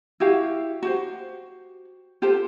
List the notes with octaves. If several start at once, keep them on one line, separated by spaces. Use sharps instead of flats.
E4 F#4 G4 F5
F#4 G4 C5
F4 G4 A4 C5